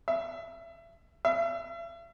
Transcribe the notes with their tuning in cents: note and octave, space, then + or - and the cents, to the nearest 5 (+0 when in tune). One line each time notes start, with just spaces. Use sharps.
E5 +30
E5 +40